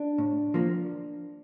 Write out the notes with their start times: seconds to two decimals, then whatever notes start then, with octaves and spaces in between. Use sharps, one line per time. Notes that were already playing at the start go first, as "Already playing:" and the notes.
Already playing: D4
0.18 A2
0.54 F3 A#3